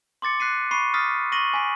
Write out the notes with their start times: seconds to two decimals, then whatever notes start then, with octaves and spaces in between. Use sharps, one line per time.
0.22 C6 D6 A6 C#7
0.40 F#6 B6 C7 D#7
0.71 B5 C#6 C7 D#7
0.94 D#6 F6 A6 B6
1.32 C#6 A#6 D#7 F#7
1.54 G#5 B6